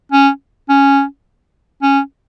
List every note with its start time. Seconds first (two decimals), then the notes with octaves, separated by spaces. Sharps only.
0.12 C#4
0.69 C#4
1.82 C#4